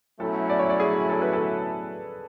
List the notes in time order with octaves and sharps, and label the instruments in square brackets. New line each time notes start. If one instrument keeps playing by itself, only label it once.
[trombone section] B2 F#3 A3 C#4 E4 [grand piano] A4
[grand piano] D5
C#5
D5
G#4
A4
B4
A4